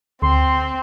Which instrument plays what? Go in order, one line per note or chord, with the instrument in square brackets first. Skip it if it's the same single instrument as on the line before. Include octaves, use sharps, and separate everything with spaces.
[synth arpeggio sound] D2 [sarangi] C4 [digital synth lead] C6